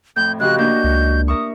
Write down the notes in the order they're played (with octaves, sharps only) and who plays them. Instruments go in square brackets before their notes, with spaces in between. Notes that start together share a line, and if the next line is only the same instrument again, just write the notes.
[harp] F2 A2 [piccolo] G6
[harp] C#3 F3 G4 [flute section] F#4 D#5 [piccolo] F#6
[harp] A#3 D4 E4 [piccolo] G6
[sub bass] C#2
[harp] A#4 E5 C#6 [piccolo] D#6